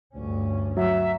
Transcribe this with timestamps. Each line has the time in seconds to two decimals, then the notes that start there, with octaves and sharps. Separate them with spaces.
0.12 D2 G2 C#4
0.77 F#3 E5